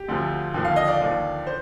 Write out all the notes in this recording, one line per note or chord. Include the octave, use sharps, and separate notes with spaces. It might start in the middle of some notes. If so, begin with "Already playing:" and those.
Already playing: G4
D2 D3 F3
D#2 D3 F3
F5
D#5
D5 F5
D#2 D3 F3
C5